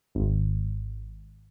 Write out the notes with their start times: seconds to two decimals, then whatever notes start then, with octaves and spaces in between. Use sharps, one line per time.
0.15 G#1